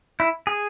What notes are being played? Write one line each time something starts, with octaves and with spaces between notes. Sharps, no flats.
E4
G#4